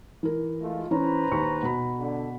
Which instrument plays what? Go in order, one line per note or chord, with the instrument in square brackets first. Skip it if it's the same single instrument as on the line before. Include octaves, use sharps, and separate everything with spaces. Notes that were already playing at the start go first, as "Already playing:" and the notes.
[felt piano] E3 A#4
[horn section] G#3 A3 F4
[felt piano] E3 C#4 [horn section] B4 C5 A#5
[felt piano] D#2 C#6
B2 B5
[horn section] D3